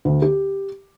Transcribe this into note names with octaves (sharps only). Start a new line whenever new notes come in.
D2
G4